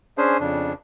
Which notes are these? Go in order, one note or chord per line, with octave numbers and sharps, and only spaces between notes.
C#4 D4 G#4 C5
F2 C#3 D4